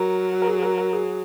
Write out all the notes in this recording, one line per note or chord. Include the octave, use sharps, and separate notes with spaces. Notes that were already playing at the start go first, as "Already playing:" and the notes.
Already playing: F#3 A#4
F#4
A#4
G#4
G#4
A#4
A#4
G#4